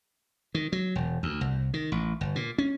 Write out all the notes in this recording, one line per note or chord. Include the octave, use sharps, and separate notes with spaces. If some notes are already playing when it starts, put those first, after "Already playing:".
D#3
F#3
E1
D2
C2
D#3
A1
G1
A#2
C#4